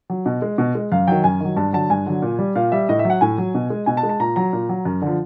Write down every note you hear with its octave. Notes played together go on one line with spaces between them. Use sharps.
F#3
B2
G#3
B2
G#3
F#2 F5
D#3 F#3 G5
F#2 G#5
D#3 F#3
G2 A5
D3 F#3 A5
G2 G#5
D3 F#3
A#2
G3
A#2 F5
G3 E5
A2 D#5
E5
F#3
F#5
A2 G#5
F#3
B2
G#3
B2 G#5
A5
G#3
A5
A#2 A#5
F#3 A#5
A#2
F#3
F#2
D3 F3